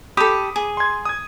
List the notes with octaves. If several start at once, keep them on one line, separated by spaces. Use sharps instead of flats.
G4 A4 B5 D6 D#6
G#4
C6 G#6
D#6 G#6